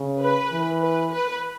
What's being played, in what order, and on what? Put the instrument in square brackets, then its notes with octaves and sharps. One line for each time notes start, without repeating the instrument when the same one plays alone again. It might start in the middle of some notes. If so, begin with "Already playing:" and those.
Already playing: [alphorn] C#3
[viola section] B4
[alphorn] E3
[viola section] B4
B4